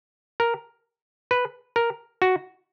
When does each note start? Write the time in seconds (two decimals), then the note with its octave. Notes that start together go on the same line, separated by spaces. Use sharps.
0.40 A#4
1.31 B4
1.76 A#4
2.22 F#4